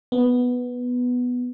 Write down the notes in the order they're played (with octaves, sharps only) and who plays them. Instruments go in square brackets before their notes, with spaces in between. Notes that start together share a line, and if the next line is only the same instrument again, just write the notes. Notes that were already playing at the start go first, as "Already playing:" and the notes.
[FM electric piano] B3